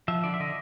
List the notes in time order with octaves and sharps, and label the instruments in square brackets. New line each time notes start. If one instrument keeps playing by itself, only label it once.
[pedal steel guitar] F3 E5
D3 D5
E5
D3 D#5